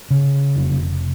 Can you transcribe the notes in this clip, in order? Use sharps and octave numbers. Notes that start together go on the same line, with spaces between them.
C#3
F1